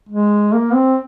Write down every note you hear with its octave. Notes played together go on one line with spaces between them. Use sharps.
G#3
A#3
C4